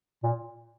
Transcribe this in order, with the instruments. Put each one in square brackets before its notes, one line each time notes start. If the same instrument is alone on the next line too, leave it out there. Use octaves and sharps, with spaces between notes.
[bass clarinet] A#2